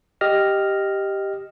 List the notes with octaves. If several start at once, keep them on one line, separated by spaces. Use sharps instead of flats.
G4 D#5 F6 A#6